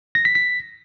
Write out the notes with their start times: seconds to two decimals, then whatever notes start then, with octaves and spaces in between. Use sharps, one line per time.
0.15 A#6
0.25 B6
0.35 B6